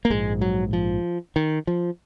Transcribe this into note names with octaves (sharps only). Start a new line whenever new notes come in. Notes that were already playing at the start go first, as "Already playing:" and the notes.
A#3
A#1 G#2 G#3
F#3
F3
D#3
F3